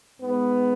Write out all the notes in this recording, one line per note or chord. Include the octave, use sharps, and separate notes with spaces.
G#2 G#3 B3